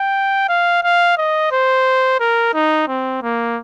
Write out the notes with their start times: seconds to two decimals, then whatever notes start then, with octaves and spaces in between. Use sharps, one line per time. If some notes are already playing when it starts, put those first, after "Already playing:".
Already playing: G5
0.49 F5
0.84 F5
1.17 D#5
1.52 C5
2.20 A#4
2.54 D#4
2.88 C4
3.23 A#3